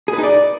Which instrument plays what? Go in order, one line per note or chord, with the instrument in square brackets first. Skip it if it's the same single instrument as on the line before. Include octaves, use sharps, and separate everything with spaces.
[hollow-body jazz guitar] G#4
B4
D#4
D5